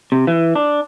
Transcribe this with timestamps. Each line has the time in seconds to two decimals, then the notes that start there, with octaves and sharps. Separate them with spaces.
0.12 C3
0.27 E3
0.55 D4